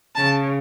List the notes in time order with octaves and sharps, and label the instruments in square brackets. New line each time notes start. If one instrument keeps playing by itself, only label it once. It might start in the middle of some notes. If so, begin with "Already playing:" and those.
[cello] C#3 [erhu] A5